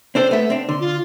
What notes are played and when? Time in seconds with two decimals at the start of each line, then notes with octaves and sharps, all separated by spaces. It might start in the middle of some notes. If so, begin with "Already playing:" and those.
0.15 C4 D4 A4 C5
0.31 A3 B3 E5
0.50 C4 D4
0.69 D3 C6
0.80 F4